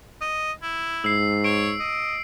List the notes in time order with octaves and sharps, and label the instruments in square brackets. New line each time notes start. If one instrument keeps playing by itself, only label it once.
[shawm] D#5
E4
[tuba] G#2 [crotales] E6 C7
[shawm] C#5 [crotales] D7
[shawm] D#5